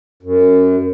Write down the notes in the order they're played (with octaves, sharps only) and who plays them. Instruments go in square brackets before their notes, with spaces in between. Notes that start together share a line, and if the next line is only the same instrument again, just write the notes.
[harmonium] F#2